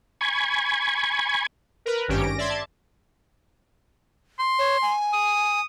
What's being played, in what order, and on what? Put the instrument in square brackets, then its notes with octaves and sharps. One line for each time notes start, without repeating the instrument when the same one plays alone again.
[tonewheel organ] G#5 B5 C#6 G#6
[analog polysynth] A#4 B4
G#1 G2 D#3 C#4 G4 D7
A#6
D5 E5 C6 G#6
A5
[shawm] C6
[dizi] C#5
G#5
[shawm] D#6